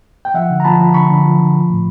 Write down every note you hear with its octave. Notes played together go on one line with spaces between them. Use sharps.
G5
F3 E5 F#5
D3
A#5
F3 A5 B5
F3
D3 B5 C#6
D3
F3
D3
F3
A2